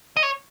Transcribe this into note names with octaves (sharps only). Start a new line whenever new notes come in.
D#5
C#5